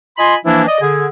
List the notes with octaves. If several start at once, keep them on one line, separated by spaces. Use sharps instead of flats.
F4 D#5 G#5 B5 C6
E3 F3 A#3 D4 E4
D5 D#5
D3 G#4